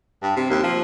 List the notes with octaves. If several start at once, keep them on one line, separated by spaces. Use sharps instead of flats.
G2
C3
D#2
F3